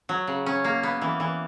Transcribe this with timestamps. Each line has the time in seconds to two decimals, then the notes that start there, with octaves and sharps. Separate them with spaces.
0.09 F#3
0.27 C#3
0.46 C#4
0.64 A#3
0.83 B3
1.02 E3
1.20 E3